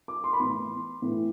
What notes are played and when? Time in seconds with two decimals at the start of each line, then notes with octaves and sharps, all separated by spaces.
0.08 D6
0.24 C6
0.33 B5
0.40 A2 E3 B3 C6
1.02 A2 E3 B3